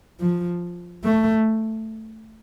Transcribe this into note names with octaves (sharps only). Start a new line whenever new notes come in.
F3
A3